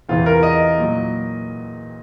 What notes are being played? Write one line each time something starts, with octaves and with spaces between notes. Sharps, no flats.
E2 C3 E3 F4
A#4
D#5
A#2 F#3